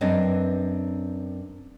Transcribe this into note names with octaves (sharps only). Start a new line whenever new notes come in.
F#2 C4 D4 B4 C#5 D#5